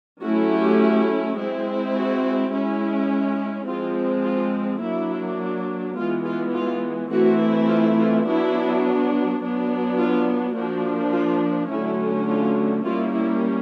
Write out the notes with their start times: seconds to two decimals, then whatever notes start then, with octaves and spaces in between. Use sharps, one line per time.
0.22 F#3 A3 C#4 E4 F#4
0.52 G4
1.37 G#3 C4 E4
1.95 F#4
2.51 G#3 C#4 E4
3.38 E4
3.67 F3 G#3 C4 F4
4.24 F4
4.81 F#3 A#3 D4 E4
5.96 E3 G#3 B3 F4
6.25 F4
6.54 F4
7.11 E3 A3 C4 E4 F#4
7.68 F4
7.97 F4
8.26 F#3 B3 D4 E4
9.41 F#3 B3 D4
9.98 F4
10.55 F3 A#3 D4 F#4
11.13 F4
11.69 D3 F#3 A3 C#4 E4
12.28 F4
12.85 G3 A#3 C#4 E4 F4
13.14 E4